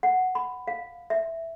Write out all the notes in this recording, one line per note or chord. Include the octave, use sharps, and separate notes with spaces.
F#5
B5
F5
E5